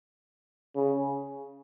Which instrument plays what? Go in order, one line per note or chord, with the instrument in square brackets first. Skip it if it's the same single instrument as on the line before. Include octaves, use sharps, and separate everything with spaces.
[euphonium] C#3